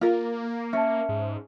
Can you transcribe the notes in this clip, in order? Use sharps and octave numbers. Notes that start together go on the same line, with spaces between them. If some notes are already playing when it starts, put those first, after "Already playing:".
A#3 F4 A#4
C#4 E5 A5
G#2